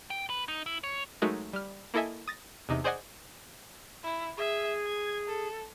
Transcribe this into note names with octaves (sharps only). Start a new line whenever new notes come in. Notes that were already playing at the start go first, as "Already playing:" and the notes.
G5
B4
D#4
E4
C#5
F#3 G#3 A3 D#4 F#4 A#4
G3 F6
A#3 E4 A4 D#5 E5 G#5
D#6 A6 A#6
E2 C3 D#4
G#4 C5 D5 D#5 F#5 G#5
E4
G#4 E5
G#6
A4